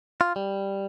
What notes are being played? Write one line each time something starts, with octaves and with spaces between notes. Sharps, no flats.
F4
G3